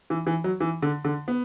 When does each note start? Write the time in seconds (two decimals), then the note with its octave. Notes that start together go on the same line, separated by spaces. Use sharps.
0.10 E3
0.27 E3
0.44 F#3
0.60 E3
0.82 D3
1.05 D3
1.28 B3